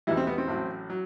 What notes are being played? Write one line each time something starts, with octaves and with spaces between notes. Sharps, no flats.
E2 B2 E3 G3 E4
C4
B3
C4
A1 A2 F#3
F#3